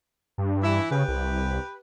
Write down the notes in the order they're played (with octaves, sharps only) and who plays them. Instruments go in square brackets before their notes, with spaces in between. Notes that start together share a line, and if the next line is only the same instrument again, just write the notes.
[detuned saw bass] G2
[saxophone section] E3 E4
[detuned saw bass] C#3 [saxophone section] G4 B4
[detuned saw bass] C2